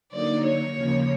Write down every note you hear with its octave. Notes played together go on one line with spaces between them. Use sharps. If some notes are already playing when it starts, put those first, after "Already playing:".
D3 F#3 A#3 D#4 D5
C#5
D#2 C#3 F3 A#3